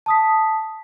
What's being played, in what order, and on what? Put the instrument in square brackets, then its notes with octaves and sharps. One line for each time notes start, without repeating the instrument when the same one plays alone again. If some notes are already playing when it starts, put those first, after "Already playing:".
[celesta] A5 D#6 B6